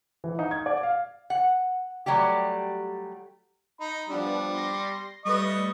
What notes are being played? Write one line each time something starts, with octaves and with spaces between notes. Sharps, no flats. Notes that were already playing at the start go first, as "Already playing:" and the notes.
E3
D#4
G#6
D5
F5
F#5
F#3 G3 A3 G4
D#4 B5
F3 G3 B3 D4
C6 A#6
G3 A3 B4 D#5 C#6 D#6